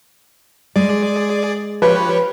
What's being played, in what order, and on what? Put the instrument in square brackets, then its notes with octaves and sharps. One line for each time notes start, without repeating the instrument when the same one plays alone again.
[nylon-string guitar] G#3 [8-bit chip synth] G#4 D5
[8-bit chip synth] F3 G4 C#5 [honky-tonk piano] B4